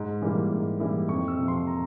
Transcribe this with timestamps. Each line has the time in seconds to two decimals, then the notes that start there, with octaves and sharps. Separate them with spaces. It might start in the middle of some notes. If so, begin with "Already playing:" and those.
Already playing: G#2
0.22 E3 G3 A#3 E4
0.51 G#2
0.80 E3 G3 A#3 E4
1.09 F2 C#6
1.28 E6
1.38 C3 F3
1.48 C6
1.67 A#5